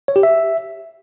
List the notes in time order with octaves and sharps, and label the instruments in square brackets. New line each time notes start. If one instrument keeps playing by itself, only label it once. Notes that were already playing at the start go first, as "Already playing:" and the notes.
[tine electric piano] C#5
G4
E5